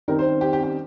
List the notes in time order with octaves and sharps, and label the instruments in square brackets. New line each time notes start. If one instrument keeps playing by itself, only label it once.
[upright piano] D#3 G3 C4 D#4 A#4
C5
G4
G4
G4